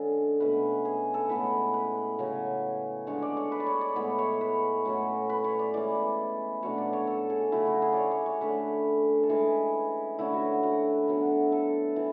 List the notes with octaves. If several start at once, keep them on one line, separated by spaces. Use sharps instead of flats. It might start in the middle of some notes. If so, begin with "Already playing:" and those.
Already playing: D3 G#3 C#4 A4
B2 A3 C#4 B4
G#4
A4
A2 G#3 B3 B4
B4
C#3 F#3 C#4
D3 G#3 D4 C#5
D5
C#5
B4
D5
C#5
D5
A2 E3 G#3 B3 C#5
C#5
B4
A2 F#3 C#4
B4
C#5
D5
E3 G#3 C#4 D5
B2 F#3 A3 D4 C#5
D5
C#5
A4
G#4
C#3 F#3 A3 E4
F#4
G#4
C#5 D5
C#5
C#5
D3 A3 C#4 B4
A4
E3 G#3 C#4 G#4
D3 A3 C#4 E4
F#4
F#4
D3 F#3 B3
A4
E3